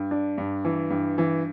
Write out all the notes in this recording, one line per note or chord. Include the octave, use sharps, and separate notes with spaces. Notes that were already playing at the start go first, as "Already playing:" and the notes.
Already playing: G2
D4
G2
E3
G2
E3